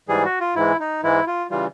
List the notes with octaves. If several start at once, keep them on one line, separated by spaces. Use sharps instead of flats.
G#2 E3 G3 G#4
F#4
F4
G#2 E3 G#3 E4
D#4
G#2 E3 G#3 E4
F4
C#3 E3 G3 F4